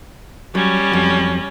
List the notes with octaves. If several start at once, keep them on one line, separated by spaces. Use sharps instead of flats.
F#3 G3 C#4
F2 F#3